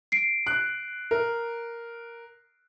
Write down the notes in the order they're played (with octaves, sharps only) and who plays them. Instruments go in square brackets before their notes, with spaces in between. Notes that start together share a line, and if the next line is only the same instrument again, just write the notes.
[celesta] C7 D7
[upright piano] F#6
A#4